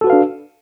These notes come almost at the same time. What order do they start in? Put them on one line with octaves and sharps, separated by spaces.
A4 F#4 B4 F5 D4